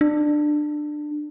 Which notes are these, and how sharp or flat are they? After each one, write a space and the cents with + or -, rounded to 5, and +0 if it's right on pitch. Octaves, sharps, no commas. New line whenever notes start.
D4 +20